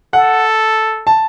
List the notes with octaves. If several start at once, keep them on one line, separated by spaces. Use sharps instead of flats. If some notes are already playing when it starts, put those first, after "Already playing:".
A4 F#5
A5